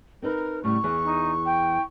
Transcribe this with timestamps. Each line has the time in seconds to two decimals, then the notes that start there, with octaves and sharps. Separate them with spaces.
0.22 C4 D#4 A#4 B4
0.64 A2 C#3 G3 C#6
0.84 E2 E3 G#4
1.05 D#4
1.46 G5